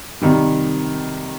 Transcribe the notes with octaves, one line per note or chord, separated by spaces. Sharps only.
C3 D#3 G3